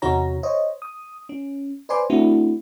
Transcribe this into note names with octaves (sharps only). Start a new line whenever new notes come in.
E2 C3 D#4 F#4 C#5 A#5
C5 C#5 D#5
D#6
C#4
B4 C5 D5 G#5 C6 D6
A3 C4 D4 E4 F#4